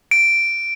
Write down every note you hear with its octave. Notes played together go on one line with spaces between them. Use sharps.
D7